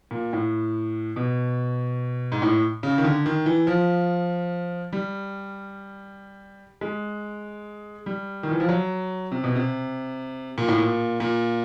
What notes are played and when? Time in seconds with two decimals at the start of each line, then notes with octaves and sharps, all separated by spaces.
0.11 A#2
0.33 A2
1.16 B2
2.32 G#2
2.42 A2
2.83 C#3
2.98 D#3
3.04 D3
3.26 D#3
3.46 E3
3.67 F3
4.93 G3
6.81 G#3
8.06 G3
8.43 D#3
8.51 E3
8.60 F3
8.69 F#3
9.32 C3
9.44 B2
9.56 C3
10.58 A#2
10.68 A2
10.78 A#2
11.20 A#2